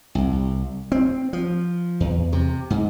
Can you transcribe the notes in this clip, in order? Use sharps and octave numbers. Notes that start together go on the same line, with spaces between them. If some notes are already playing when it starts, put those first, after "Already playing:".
C2
C4
F3
E2
C3
G#2